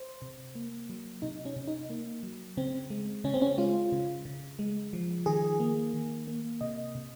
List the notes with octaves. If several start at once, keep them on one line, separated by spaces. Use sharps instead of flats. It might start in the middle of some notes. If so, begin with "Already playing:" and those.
Already playing: C5
C3
A#3
F#3
C3 D#4
C#4
C3
D#4
A#3
F#3
C#3 C4
G#3
C#3 C#4
C4
C#4
G#3 F4
C#3
C#3
G#3
F3
D#3 G#4
A#3
D#3
A#3
C3 D#5
C3